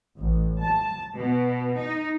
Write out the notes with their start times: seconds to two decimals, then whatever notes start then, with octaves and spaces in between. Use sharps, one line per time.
0.18 A1
0.60 A5
1.15 B2
1.77 D#4